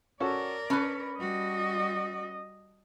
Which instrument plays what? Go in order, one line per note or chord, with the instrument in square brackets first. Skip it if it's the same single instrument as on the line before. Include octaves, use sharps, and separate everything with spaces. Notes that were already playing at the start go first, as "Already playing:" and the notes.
[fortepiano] C#4 F#4 A4 [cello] A#4 D5
[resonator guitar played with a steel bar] C#4 B4 [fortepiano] A5 B5 F#6
[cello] G3 F#4 [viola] D#5